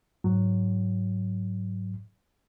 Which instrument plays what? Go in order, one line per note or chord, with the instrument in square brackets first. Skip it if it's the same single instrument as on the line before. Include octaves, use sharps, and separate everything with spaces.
[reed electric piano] G#2 F#3